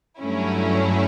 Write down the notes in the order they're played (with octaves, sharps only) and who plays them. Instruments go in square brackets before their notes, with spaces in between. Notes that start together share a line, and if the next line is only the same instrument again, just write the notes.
[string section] G2 F#3 A3 C#4 E4